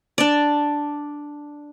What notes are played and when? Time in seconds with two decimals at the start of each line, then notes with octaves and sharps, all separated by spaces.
0.18 D4 D5